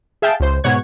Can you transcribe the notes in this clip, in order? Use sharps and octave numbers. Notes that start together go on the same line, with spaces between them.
G#4 E5 F5 G5 A5
C#2 C5
G#2 B2 C#5 F#5 G#6